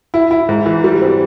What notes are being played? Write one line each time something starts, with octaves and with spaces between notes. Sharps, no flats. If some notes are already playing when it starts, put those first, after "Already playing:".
E4
E4
G#2
E3
G3
C4